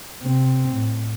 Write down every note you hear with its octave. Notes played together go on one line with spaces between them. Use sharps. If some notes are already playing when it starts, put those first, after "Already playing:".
C3 C4
A2